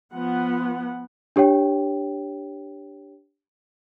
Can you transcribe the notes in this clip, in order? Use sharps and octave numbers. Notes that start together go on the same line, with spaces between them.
F3 B3 F#5
D4 G4 C#5 G5